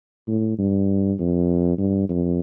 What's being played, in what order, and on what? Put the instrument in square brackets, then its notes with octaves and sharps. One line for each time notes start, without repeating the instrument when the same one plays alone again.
[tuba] A2
G2
F2
G2
F2